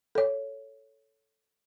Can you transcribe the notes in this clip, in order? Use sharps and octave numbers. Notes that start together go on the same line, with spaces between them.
A4 C#5